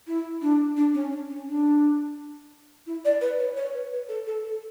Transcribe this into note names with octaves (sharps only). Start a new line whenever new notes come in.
E4
D4
D4
C#4
D4
C#4
D4
E4
D5
B4
C#5
C#5
B4
B4
A4
A4
A4